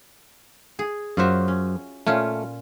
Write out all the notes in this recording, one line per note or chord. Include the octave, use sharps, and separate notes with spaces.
G#4
F#2 F4 F#4 C5 E5
C#4
A#2 A3 C#4 F4